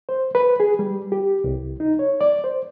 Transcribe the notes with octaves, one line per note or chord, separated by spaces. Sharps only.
C5
B4
G#4
G3
G4
C2
D#4
C#5
D5
C5